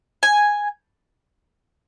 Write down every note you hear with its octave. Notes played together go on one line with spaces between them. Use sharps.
G#5